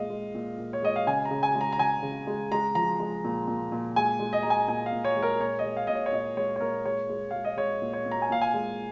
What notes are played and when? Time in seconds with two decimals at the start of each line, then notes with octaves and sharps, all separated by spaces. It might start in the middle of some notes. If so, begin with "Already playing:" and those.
Already playing: A#2 G#3 D#5 F5
0.10 G#3
0.34 A#2
0.59 A#2
0.73 C#5
0.83 G#3 D#5
0.96 F5
1.07 C#3 G#5
1.25 A#5
1.31 C#3
1.43 G#5
1.55 G#3
1.61 A#5
1.73 A#5
1.79 C#3 G#5
2.03 C#3
2.27 G#3
2.52 G#3 A#5
2.75 F3 A#5
3.00 G#3
3.24 A#2
3.48 A#2
3.72 A#2
3.96 G#3 G#5
4.20 G#3
4.33 D#5
4.43 G#3 A#5
4.50 G#5
4.68 A#2 G#5
4.86 F5
4.92 A#2
5.05 C#5
5.16 G#3
5.23 A#4
5.40 A#2 C#5
5.59 D#5
5.65 G#3
5.77 F5
5.87 A#2 D#5
5.95 C#5
6.06 C#5
6.13 A#2 D#5
6.37 G#3 C#5
6.56 C#5
6.61 A#2 A#4
6.85 G#3 C#5
7.10 G#3
7.31 G#3 F5
7.44 D#5
7.57 G#3 C#5
7.82 A#2
7.93 C#5
8.06 A#2
8.11 A#5
8.22 G#5
8.30 A#2 F5
8.41 G#5
8.54 G#3